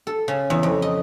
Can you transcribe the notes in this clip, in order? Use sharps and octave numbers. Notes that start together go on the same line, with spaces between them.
A4
C#3
E2
F2
D#5